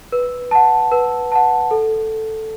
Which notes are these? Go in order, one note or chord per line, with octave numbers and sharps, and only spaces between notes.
B4
F#5 A5
B4
F#5 A5
A4